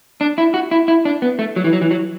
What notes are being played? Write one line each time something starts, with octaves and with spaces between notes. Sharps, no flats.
D4
E4
F#4
E4
E4
D4
B3
A3
F#3
E3
F#3
E3
F#3